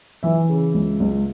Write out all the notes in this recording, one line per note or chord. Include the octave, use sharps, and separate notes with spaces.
E3 E5
C#3
C#2
C#2